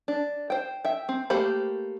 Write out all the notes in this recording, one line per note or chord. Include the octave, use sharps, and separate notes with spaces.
D4
C5 G5
E5 G5
C4
A3 A#3 G4 C5 B5